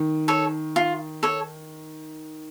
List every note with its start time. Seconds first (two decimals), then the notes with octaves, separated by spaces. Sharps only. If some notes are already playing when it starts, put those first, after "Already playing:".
Already playing: D#3
0.28 A4 C#5
0.76 F4
1.23 A4 C#5